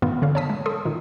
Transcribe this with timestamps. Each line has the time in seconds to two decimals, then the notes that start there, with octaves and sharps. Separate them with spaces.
0.02 G2 A#2 D#3 A3 B3 F4
0.22 D3 C#5 F5
0.35 C#5 G5 A5 D#6 B6
0.50 G#3
0.66 A4 C6 D#6
0.85 A#2 D#3